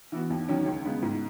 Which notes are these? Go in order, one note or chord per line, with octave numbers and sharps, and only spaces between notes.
E3 B3 F#4
D#2
D#3 F#3 C#4
C#2
C#3 G#3 B3
G#2